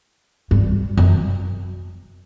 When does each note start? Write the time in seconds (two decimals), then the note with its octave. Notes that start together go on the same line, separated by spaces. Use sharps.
0.51 G2
0.97 F#2